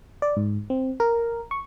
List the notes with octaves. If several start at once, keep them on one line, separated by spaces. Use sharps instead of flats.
D5
G#2
C4
A#4
C#6